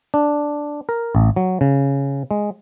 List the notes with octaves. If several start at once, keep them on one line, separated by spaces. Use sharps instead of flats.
D4
A#4
A1
F#3
C#3
G#3